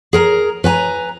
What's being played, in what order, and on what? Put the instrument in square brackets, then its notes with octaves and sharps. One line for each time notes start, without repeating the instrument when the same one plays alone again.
[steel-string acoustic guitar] G#4 A#4 A#5
B4 G#5 A#5